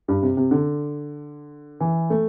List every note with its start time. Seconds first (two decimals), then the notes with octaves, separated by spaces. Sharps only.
0.08 G2
0.22 C3
0.37 C3
0.51 D3
1.80 E3
2.10 A3